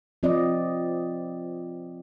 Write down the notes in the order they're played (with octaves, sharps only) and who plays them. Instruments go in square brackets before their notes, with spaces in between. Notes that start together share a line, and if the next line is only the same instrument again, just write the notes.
[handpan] F3 C4 F4 D5 D#5